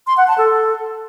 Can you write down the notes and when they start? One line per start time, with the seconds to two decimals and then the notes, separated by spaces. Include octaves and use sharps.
0.07 C6
0.17 F#5
0.27 A5
0.38 A4